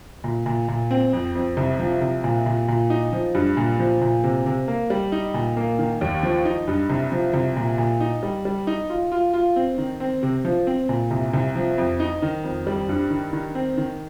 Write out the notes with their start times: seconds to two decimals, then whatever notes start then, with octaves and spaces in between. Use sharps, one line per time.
0.24 A#2
0.46 A#2
0.68 A#2
0.91 C4
1.13 F2
1.35 F2
1.57 C2
1.79 F3
2.01 C2
2.24 A#2
2.46 A#2
2.68 A#2
2.90 D#4
3.13 F3
3.35 G2
3.57 A#2
3.79 F3
4.01 A#2
4.24 C3
4.46 C3
4.68 A#3
4.90 G3
5.12 D#4
5.34 A#2
5.57 A#3
5.79 D#3
6.01 D#2
6.23 F3
6.45 D#4
6.68 G2
6.90 C2
7.12 F3
7.34 C2
7.57 A#2
7.78 A#2
8.00 D#4
8.23 G3
8.45 G3
8.67 D#4
8.89 F4
9.12 F4
9.34 F4
9.56 C4
9.78 D#3
10.00 C4
10.23 C3
10.45 F3
10.67 C4
10.89 A#2
11.11 C2
11.34 C2
11.56 F3
11.78 F2
12.00 D#4
12.22 D#3
12.44 F2
12.67 G3
12.89 G2
13.10 D#3
13.33 D#3
13.55 C4
13.77 D#3